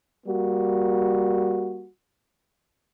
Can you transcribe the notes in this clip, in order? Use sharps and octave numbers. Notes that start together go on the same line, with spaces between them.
G3 A#3 F#4